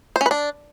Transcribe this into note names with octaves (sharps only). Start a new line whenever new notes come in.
C5
C#4
B4
D4